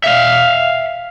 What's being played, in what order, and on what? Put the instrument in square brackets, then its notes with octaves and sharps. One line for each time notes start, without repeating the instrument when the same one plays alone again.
[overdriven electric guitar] E5 F5